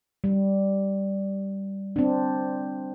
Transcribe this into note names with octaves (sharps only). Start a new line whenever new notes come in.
G3
C4 D4